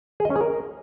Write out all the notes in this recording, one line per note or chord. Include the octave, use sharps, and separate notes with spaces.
G#4
D#5
C#4
G#4
A#4